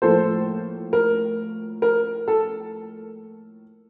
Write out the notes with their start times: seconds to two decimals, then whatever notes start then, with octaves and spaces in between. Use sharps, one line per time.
0.02 A2 F3 A#3 A4 C5
0.93 A#4
1.82 A#4
2.28 A4